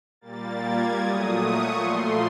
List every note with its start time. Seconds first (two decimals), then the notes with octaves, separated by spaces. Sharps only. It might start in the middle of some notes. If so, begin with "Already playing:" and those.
0.21 A#2 G3 A#3 A6
0.60 G#6
0.99 A#2 F#3 A3 D#6
1.38 C#6
1.76 A#2 F3 A3 C6